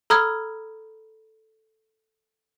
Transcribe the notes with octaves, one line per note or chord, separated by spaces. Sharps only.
A4 A#5 B5 D#6 F6 G#6